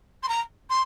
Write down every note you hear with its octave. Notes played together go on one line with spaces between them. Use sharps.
C6
A#5
C6